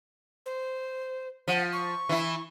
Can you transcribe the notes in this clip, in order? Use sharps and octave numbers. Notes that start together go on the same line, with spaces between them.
C5
F3 F#5
C#6
E3 E4